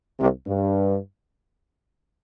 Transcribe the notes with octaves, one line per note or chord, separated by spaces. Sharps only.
C2 C3
G2